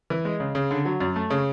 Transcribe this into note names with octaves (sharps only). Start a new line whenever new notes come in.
E3
G#3
C#3
C#3
D3
F#3
F#2
A3
C#3